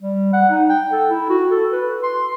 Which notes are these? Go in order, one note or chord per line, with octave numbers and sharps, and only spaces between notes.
G3
F#5
D#4
G5
A4
E4
F#4
A4
B4
C6